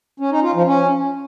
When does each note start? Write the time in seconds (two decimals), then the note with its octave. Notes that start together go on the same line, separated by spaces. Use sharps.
0.20 C#4
0.31 D#4
0.43 F4
0.55 F3
0.67 C#4